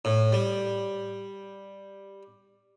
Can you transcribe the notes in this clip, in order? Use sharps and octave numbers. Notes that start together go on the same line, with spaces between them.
A2
G3